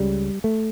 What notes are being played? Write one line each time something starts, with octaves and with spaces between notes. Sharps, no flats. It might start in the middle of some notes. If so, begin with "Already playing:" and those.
Already playing: C#2 C#3 G3
A3